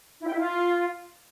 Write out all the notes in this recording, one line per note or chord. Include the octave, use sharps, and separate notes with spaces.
E4
G5
E4
F4